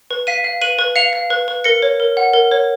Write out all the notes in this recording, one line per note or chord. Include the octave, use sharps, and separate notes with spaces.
B4
F5 B6 D#7
F5
B4 D#7 F#7
B4
F5 C#7 F7
F5
B4
B4
A#4 A#6 C#7
C#5
A#4
F#5
A#4
C#5